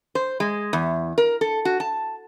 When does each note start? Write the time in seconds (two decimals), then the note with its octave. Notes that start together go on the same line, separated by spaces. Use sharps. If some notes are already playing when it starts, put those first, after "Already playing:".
0.15 C5
0.40 G#3
0.73 E2
1.18 A#4
1.41 A4
1.65 F#4
1.80 A5